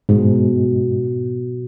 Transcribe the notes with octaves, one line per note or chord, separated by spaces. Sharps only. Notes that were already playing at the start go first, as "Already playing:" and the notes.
G#2 B2